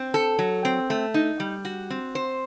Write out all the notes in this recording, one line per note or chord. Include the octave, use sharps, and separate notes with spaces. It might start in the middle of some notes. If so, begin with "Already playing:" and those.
Already playing: C4
A4
F#3
C4
A3
D#4
G3
F#4
C4
C5